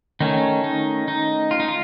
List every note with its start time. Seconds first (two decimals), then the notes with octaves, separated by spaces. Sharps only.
0.20 D#3 A3 C#4 D#4
0.64 D#4
1.08 D#4
1.51 F4
1.60 D#4
1.68 F4